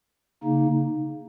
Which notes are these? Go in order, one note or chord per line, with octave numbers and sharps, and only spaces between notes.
C#3 A#3 D#4